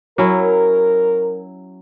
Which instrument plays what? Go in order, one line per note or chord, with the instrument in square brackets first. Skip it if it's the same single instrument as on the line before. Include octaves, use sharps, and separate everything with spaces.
[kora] F#3 C#4 E4 [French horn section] A#4